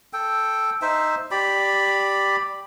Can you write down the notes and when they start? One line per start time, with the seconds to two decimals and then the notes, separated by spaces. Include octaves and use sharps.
0.13 A4 G5
0.82 D#4 C5 E5
1.31 G4 D5 B5